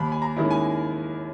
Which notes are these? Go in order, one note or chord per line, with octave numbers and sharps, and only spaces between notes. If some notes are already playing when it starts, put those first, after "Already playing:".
Already playing: D#2 B5
G#5
A#5
D#3 G#3 C#4 E4
G#5